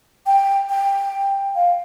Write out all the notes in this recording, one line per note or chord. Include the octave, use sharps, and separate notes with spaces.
G5
G5
F5